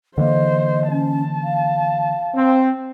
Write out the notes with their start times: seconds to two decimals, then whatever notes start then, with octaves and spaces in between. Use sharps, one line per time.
0.18 D3 E3 A#3 C5 D#5
0.91 C#4 A5
1.44 F5
2.35 C4